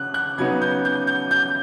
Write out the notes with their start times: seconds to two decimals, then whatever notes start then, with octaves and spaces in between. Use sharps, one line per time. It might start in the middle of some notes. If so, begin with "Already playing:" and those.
Already playing: C#3 F#6
0.14 F#6
0.38 C#3 F#3 B3 D#4 G#6
0.61 G6
0.85 G6
1.07 G6
1.31 G6